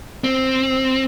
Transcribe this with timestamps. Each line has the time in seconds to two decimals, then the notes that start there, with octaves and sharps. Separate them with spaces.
0.24 C4